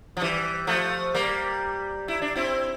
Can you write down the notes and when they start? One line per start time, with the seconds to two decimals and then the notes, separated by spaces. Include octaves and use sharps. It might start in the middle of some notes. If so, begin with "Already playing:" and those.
0.17 F3
0.21 E3 G3
0.67 F3 A3
1.14 G3 A#3
2.08 E4
2.22 D4
2.35 C4 E4